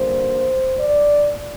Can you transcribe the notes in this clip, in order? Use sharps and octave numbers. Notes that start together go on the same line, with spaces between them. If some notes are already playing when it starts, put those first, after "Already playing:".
Already playing: D3 G3 A#3 C5
D5